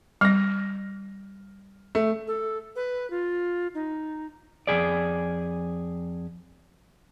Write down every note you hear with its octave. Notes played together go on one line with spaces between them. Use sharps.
G3 F6 A#6
A3
A4
B4
F4
D#4
F2 A#2 G#4 D5